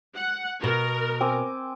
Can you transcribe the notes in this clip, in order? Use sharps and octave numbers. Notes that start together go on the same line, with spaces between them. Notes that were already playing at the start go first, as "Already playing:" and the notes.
F#5
B2 A#4
C4 G#5 D6